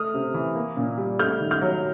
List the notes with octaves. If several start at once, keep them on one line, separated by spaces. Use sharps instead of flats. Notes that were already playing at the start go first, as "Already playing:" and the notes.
Already playing: A3 D#6 F6
C3
E3
A#3
A#2
G3
A3 F6 G6
D#3
F6 G6
F#3